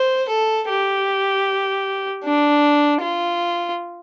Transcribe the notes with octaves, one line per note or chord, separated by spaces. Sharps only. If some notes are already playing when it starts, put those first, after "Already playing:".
Already playing: C5
A4
G4
D4
F4